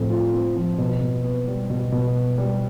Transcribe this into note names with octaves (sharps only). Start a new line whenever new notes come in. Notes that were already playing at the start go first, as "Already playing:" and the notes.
Already playing: A2 F3 C4 F4
F4
C4
F3
B2
B2
B3
G3
B2
B2
B3
G3